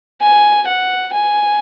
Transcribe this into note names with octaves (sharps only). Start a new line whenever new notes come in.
G#5
F#5
G#5